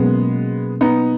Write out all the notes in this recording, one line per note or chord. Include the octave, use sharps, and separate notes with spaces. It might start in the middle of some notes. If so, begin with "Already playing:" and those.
Already playing: B2 F#3 G#3 A#3 B3 C#4
B3 D#4